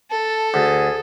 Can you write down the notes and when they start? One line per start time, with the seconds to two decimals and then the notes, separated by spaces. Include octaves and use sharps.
0.11 A4 A5
0.54 D2 G#4